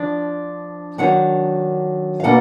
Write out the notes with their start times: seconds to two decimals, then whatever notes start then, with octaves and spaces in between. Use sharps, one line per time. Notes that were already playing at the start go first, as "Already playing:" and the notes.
Already playing: F3 D4
0.98 D#3 F#3 D4 F#5
2.20 F5
2.24 B2 A#3 D4 F#5